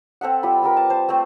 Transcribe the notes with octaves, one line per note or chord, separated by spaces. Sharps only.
C4 A4 E5 F#5
G3 F4 B5
C4 G4 A#4 B4
A5
C5 A5
A3 C4